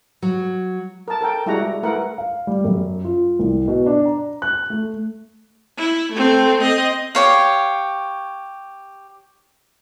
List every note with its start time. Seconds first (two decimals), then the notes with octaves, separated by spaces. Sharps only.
0.22 F#3
1.08 A#4 A5
1.21 A4 A#4 G5
1.46 G3 G#3 E4 F#4 F#5 A#5
1.83 A3 E4 A#4 B4 F#5
2.18 F5
2.47 G3
2.64 F#2
3.04 F4
3.39 C2
3.68 B2
3.86 D4
4.05 A#5
4.42 F#6
4.70 A3
5.77 E4
6.12 A3 C4
6.60 C4 D#5
7.15 G4 C#5 F5